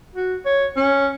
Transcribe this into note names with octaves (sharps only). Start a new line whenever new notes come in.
F#4
C#5
C#4